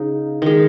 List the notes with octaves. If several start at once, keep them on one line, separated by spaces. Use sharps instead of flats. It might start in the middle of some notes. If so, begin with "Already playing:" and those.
Already playing: C#3 D#4
D#3 G#3